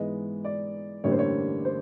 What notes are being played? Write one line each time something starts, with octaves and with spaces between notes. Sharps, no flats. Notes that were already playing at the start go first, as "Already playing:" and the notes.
Already playing: G#2 E3 G#3 B3 D#5
D5
A1 G2 D3 G3 A#3 C#5
C5
C#5
C5